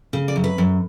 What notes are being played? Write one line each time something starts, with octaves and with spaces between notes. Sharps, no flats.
C#3
D5
F#2
B4
F#2